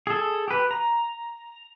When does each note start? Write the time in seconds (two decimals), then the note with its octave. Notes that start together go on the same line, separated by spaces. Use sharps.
0.07 G#4 A4
0.48 G4 B4
0.71 A#5